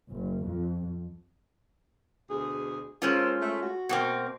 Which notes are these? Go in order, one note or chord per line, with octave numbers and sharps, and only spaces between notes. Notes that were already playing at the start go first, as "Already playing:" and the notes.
F#1
F2
D2 B2 G#4
G#3 A#3 C#4 F4 A4 C5
A3
F#4
B2 A#3 C4